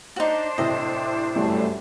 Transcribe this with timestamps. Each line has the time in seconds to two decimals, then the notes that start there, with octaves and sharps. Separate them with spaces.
0.16 D4 D#4 F#4 C5
0.58 A2 C3 E3 D#5
1.35 G1 F#2 C3 E3 G3 A3